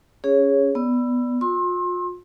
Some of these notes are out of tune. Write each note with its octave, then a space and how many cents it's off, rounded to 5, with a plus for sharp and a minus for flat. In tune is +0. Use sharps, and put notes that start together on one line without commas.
C#4 +10 G#4 -10 C#5 +0
B3 +0 D5 +0 E6 +20
F4 +40 C6 +30 E6 -20